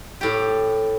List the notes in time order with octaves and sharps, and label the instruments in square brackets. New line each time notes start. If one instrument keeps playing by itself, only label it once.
[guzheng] A2 G4